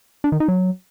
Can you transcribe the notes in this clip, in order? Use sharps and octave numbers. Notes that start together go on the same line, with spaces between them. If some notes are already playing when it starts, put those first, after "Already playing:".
D4
D#3
D#4
F#3